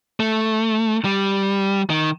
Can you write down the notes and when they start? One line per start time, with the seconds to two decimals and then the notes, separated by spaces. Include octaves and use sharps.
0.20 A3
1.05 G3
1.90 D#3